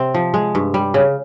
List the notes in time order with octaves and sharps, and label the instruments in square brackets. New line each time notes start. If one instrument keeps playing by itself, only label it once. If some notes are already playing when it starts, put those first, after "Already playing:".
Already playing: [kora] C3 C4
F3
G#3
G2
G3
C#3